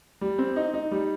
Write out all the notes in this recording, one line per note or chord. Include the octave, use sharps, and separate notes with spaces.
G3
C4
D#4
D#4
G3